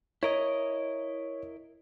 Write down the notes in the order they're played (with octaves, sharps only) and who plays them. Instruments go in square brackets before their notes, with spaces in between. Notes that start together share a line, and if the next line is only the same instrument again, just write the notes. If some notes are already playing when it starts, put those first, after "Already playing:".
[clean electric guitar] E4 A#4 D#5 [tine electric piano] C#5